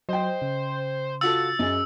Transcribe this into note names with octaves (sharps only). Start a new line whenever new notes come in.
F#3 C5 D#5 G5
C#3
F4 F#4 A4 E6 A6
F#2 G#4 D#5